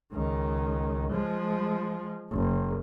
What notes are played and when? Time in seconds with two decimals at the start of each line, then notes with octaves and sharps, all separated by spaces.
0.13 C#2 D#3
1.11 F3 G#3
2.31 F#1